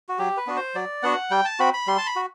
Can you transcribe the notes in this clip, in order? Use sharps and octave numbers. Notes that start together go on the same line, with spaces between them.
F#4
F#3 G4
B4
B3 D4 F#4
C5
F#3 D5
B3 D4 F#4 F#5
G3 G5
A5
C4 F#4 B5
B5
G3 C6
A5
B5
F#4